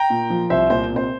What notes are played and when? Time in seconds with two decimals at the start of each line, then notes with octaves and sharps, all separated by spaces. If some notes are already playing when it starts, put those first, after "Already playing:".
Already playing: G5 A#5
0.10 A#2
0.30 F3
0.50 C2 C5 E5
0.70 A#2 C5
0.90 C3
0.96 C5